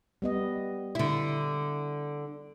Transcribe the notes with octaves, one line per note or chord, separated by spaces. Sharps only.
G3 B3 D#5
D3 E4